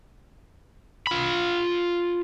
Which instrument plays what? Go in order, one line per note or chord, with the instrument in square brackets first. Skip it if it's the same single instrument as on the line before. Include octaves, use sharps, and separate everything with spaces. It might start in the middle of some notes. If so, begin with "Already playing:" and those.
[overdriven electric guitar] F4 B5